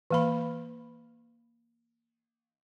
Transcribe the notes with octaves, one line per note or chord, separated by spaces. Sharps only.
E3 A#3 B5